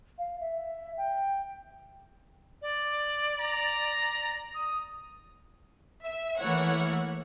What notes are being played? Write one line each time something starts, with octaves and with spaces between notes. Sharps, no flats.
F5
E5
G5
D5
A#5
D#6
E5
E3 A3 A#3 E4 C#5 F#5